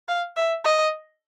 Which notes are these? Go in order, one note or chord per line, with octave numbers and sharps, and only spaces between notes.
F5
E5
D#5